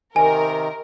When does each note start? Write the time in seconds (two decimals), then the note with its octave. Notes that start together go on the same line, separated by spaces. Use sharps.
0.16 C3 D#3 A#4 G#5